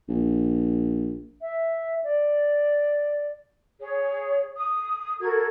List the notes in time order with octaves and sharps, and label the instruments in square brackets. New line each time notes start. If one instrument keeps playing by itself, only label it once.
[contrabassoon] A#1
[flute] E5
D5
[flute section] G#4 C#5
D#6
F#4 A4 A#4 G#6